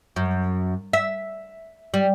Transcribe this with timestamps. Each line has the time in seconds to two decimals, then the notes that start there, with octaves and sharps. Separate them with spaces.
0.16 F#2
0.93 E5
1.94 G3